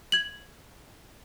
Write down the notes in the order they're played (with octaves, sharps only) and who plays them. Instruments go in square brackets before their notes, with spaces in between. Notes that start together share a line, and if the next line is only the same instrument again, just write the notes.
[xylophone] G#6 F#7